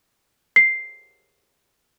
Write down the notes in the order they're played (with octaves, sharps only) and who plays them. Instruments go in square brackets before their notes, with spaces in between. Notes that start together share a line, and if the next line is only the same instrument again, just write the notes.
[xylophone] C7